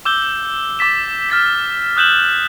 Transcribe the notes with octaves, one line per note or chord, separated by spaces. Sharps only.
D6 E6 G6 G7
D6 A6 B6 E7
F6 A6 B6
D#6 F#6 G6 E7 F#7